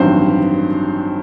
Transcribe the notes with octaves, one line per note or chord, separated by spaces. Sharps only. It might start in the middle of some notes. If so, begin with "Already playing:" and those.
Already playing: A1 G2 D#3 F#3 C4 C5